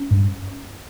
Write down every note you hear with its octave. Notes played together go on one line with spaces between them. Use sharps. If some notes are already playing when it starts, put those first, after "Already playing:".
Already playing: C#4
G2